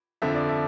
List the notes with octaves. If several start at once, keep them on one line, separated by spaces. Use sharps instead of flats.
F2 D3 F3 E5
D5
E5